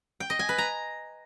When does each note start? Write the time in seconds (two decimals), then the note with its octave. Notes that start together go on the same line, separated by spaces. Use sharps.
0.20 G5
0.30 D#5
0.39 G#5
0.49 B4
0.58 A#5